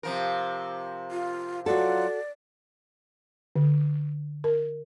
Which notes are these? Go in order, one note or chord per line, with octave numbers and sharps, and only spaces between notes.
C3 F3 A#4
F4
F#3 F4 F#4 A4 D5 F#5
D3
A#4